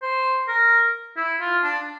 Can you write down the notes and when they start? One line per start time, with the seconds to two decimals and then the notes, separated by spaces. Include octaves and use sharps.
0.02 C5
0.48 A#4
1.17 E4
1.40 F4
1.63 D4